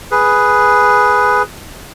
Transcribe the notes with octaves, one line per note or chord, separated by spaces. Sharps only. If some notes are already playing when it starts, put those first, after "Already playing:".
G#4 B4